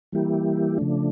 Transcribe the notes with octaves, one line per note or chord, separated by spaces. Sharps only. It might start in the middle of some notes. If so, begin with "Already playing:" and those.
E3 G3 A#3 E4 G4
C#3 F3 A3 D4